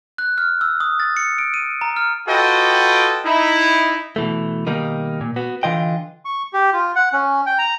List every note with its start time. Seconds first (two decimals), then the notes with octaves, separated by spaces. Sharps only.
0.18 F#6
0.38 F6
0.61 E6
0.80 D#6
1.00 A6
1.17 C#7
1.38 D7
1.54 D#7
1.81 A#5
1.96 F6
2.28 F4 F#4 A4 B4 D#5 G5
3.25 D#4 E4
4.16 B2 E3 A3
4.67 B2 D#3 G3 A#3 D#4
5.21 A#2
5.36 B3 F#4
5.63 D3 E3 F4 D#5 G5
6.25 C#6
6.53 G4
6.73 F4
6.95 F#5
7.13 C#4
7.46 G5
7.59 A#5